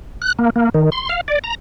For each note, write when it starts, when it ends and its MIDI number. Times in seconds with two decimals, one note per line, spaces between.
0.22 0.33 90
0.39 0.50 58
0.56 0.69 58
0.74 0.90 51
0.92 1.09 84
1.09 1.21 77
1.28 1.39 74
1.44 1.55 82